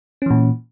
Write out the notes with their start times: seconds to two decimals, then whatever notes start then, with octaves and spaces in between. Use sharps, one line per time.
0.22 C#4
0.26 E3
0.30 A#2